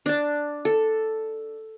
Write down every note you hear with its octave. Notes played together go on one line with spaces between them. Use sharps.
D4 A5
A4